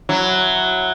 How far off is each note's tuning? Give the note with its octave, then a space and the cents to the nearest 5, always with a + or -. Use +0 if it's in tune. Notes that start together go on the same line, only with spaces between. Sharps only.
F#3 +0 E4 +0